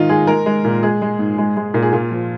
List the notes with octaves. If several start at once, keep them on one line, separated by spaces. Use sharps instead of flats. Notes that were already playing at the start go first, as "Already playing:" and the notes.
Already playing: G#2 D#3 D#4 F4
G#3 G#4
G#3 A#4
G#3
A#2
G#3 G#4
G#3
G#2
G#3
G#3
A#2
G#4
A#2 F4
F3